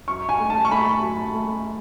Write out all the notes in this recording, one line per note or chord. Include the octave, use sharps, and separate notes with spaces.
F#2 C#6
G#5
A3
A5
C#6
A3 B5
F#2
A3